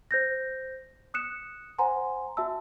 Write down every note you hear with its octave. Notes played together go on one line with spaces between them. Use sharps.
C5 G6 A#6
D#6 F#6 C#7 E7
C5 F#5 G#5 A#5 C6
F#4 E5 A5 E6